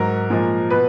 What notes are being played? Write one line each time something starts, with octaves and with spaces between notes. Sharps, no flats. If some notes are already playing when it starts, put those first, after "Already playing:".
Already playing: G#2 F#3 A#4
A#2 F3 G#3
B2 B4